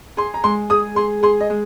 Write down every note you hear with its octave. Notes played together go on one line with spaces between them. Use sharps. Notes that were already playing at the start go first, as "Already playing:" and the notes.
G#4 C6
A#5
G#3 C6
G#4 D#6
G#4 C6
G#4 C6
D#5
G#3